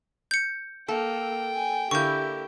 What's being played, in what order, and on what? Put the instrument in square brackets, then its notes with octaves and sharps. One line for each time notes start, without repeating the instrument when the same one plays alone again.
[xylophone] G6 C#7
[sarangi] A#3 [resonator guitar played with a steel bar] A4 [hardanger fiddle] G5
[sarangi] G#5
[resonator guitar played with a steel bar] D3 A#3 E4 [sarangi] G4 [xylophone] C#6 G6